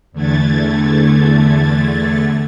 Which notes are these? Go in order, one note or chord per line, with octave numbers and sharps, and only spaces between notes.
E2 D3 A3 G#6 A6